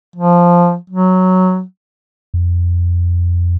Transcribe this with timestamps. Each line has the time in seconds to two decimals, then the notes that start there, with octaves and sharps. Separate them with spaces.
0.16 F3
0.90 F#3
2.34 F2